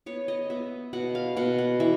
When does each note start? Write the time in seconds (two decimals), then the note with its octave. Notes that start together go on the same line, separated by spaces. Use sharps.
0.06 B3 C#5
0.28 D#5
0.50 B3 E5
0.93 B2 F#5
1.15 F5
1.37 B2 F#5
1.59 F#5
1.80 E3 E5